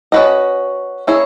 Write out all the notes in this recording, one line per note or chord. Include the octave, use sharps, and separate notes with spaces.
C#4 F#4 B4 D#5
A#3 C#4 E4 G#4 C#5